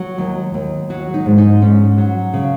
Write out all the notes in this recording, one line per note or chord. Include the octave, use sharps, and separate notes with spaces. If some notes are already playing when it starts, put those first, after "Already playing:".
Already playing: F#3
D#2
D#2
F#3 F#4
D#4
G#2
D#4
G#2 C#4
F#3
C#3